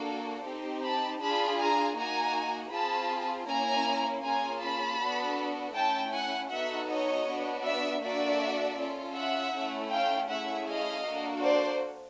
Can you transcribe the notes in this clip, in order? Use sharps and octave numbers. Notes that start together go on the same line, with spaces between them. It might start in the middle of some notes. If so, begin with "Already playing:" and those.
Already playing: A#3 D4 F#4 A4
C4 D#4 G4
A5 B5
D4 F4 G#4 A5 B5
G#5 A#5
A#3 D#4 F#4 G#5 A#5
C4 F4 G#4 A5 B5
A#3 C#4 E4 G#5 A#5
A#3 C#4 F4 G#4 G#5 A#5
A5 B5
B3 D4 F#4 A4
A3 C#4 E4 G5 A5
F#5 G#5
B3 D#4 F#4 A4 E5 F#5
C#5 D#5
B3 D4 F#4
D5 E5
A#3 D4 F#4 A4 D5 E5
C#4 F4 A4
E5 F#5
A3 C#4 E4
F5 G5
A3 C#4 E4 G#4 E5 F#5
D#5 F5
A#3 D4 F#4 A4
C5 D5